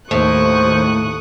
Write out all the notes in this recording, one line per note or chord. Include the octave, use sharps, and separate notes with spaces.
D#2 A2 C5 C#6 D#6 F#6